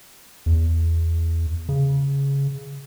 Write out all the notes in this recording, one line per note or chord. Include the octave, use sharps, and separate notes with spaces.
E2
C#3